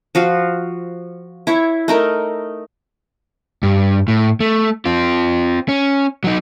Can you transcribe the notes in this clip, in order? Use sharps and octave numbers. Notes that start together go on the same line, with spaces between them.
F3 F#4 F5
E4 C#5
A3 D#4 A#4
G2
A2
A3
C4 F4
C#4
F#3 D#4